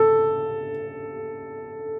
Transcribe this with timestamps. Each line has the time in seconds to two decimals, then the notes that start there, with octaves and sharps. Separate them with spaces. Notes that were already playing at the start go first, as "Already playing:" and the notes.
Already playing: A4